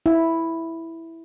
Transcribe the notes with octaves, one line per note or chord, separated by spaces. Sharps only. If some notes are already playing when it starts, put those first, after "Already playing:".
E4